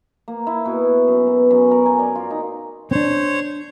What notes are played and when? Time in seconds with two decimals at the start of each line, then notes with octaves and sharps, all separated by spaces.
0.28 A#3
0.47 E4
0.65 B2
0.85 E4
1.07 F#2
1.27 B3
1.51 F#2
1.71 A#4
1.86 G#5
1.99 D5
2.15 F4
2.30 D#4
2.91 C4 D4 C5 C#5